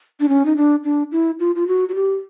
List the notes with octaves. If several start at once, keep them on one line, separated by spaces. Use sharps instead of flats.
D4
C#4
D#4
D4
D4
E4
F4
F4
F#4
F#4
G4